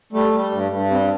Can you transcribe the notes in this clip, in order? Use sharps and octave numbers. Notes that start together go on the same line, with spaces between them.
G3 A3
G3
G2
G2
G3 C4